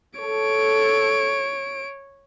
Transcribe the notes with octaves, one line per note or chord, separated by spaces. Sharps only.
A4 C#5 D7